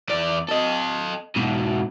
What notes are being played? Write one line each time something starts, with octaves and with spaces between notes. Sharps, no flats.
E2 D5
A4 D#5
G#2 B2